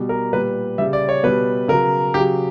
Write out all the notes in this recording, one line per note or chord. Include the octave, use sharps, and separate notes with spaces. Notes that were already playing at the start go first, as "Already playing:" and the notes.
Already playing: B2 G3
A#4
A#2 G3 B4
C#3 G3 E5
D5
C#5
B2 G3 B4
C#3 F#3 A#4
C#3 F#3 G4